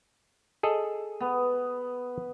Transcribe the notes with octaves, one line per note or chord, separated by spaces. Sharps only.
G#4 A4 D#5
B3